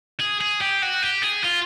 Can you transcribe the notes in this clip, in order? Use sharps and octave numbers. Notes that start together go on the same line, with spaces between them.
G#4
G#4
G4
F#4
G4
G#4
F4